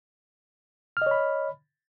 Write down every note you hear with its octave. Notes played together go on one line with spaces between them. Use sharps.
C#5 D#5 B5 F6